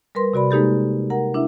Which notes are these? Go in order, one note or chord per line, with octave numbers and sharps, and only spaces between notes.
G3 A#4 B4 C6
C3 F#4 D5 B5
G#3 A#3 D#4 G4 A4
A#4 F#5 A#5
D4 E4 E5